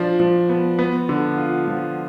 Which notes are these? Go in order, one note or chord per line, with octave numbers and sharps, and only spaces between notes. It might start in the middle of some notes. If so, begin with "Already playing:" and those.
Already playing: F3 D4
F3
B3
B3
D3
F4
F3